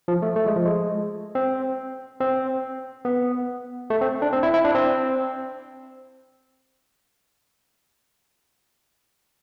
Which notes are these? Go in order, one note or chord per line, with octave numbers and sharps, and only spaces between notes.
F3
A3
A3
G#3
F3
G#3
C4
C4
B3
A3
C4
D4
C4
E4
E4
D4
C4